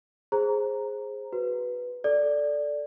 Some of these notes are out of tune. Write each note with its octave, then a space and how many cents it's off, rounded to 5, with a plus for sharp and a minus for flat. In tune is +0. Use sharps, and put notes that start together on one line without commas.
G#4 +0 C5 +15 A#5 +0
F#4 +0 B4 +0
A4 +0 D5 +0